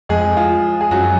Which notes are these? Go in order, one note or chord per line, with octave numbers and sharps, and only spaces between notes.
F2 G#3 G#4
F3 F4
G#4
F#2 F#3 F#4